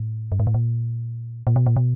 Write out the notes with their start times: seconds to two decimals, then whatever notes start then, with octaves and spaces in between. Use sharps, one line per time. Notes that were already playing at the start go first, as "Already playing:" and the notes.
Already playing: A2
0.32 G2
0.40 G#2
0.47 A2
0.54 A#2
1.47 A#2
1.56 B2
1.66 A#2
1.76 B2